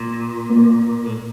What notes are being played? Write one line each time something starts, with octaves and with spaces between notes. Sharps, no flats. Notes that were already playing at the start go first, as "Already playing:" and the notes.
Already playing: A#2
A#3
A2